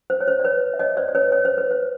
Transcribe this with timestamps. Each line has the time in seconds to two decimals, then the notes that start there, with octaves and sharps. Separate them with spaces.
0.10 C5
0.21 C#5
0.28 C5
0.40 D5
0.44 B4 C#5
0.74 E5
0.79 C#5 D#5
0.97 C5 D5
1.08 D5
1.15 B4 C#5
1.32 C#5
1.45 C5
1.58 B4
1.71 C5